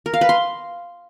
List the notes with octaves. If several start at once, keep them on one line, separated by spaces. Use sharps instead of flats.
A#4
F5
B4
C6